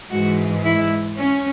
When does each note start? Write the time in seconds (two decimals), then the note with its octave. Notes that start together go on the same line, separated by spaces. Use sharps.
0.10 G#2 E3 G#3 F#4
0.64 E4
1.18 C#4